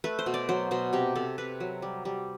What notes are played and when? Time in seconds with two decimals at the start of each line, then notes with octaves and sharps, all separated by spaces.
0.04 A3 B4
0.19 C5
0.26 B2
0.34 D5
0.49 F#3 C5
0.71 B2 C5
0.93 C3 G4
1.15 C3 A4
1.38 C3 B4
1.60 F#3
1.82 G3
2.05 G3